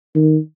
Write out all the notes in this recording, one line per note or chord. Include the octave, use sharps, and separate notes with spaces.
D#3